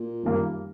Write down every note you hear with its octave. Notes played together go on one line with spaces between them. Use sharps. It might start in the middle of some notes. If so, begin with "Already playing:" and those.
Already playing: A#2
F#2 D#3 G3 A#3